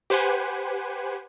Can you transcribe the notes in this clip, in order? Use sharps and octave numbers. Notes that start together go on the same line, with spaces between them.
G4 B4 C5 F#5 G#5